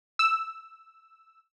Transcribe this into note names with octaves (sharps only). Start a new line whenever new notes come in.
E6